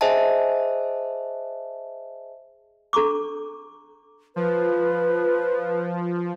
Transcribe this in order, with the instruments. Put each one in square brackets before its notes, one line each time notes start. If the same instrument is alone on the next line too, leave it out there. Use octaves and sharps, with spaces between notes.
[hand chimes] G#4 C5 D#5 E5 G#5 A5
[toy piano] D4 A4 A#5 C#6 D6
[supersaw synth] F3 [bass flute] B4